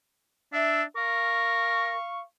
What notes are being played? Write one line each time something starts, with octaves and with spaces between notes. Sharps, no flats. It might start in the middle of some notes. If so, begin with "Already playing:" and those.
D4 E5
A#4 F5 C#6